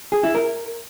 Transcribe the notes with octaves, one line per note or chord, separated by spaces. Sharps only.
G#4
E4
A#4